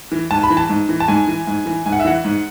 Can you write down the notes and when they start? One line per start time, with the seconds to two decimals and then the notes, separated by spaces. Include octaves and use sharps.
0.12 E3
0.31 G#2 A5
0.43 B5
0.50 E3
0.57 A5
0.69 G#2
0.89 E3
1.00 A5
1.08 G#2 G#5
1.28 E3
1.47 G#2
1.66 E3
1.86 G#2 G#5
1.92 F#5
1.99 E5
2.05 E3 F#5
2.24 G#2